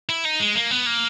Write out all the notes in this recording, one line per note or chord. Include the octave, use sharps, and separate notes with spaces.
E4
D#4
G#3
A#3
B3
A#3